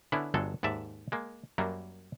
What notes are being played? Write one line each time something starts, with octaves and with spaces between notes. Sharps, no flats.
D3 B3 C#4 D4 E4
G1 G2 F#3 G#3 A4
D#2 G#2 D5 E5 A5
G#3 A#3
F#2 F#3 G3 A#3